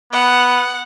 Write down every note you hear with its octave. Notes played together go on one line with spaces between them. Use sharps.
B3 F#5